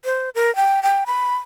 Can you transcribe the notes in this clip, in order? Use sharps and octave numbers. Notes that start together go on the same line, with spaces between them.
C5
A#4
G5
G5
B5